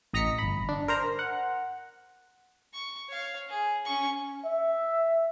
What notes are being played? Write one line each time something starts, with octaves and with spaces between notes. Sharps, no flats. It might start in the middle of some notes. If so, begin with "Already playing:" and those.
A1 D#5 A#5 A#6 B6 C#7
G1 B5
D4
A#4 C5 A#5
F#5
C#6
C#5 F5
G#4
C#4 C#6
E5